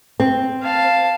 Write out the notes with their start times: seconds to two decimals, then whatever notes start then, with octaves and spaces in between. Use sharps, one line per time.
0.20 C4
0.62 F5 A5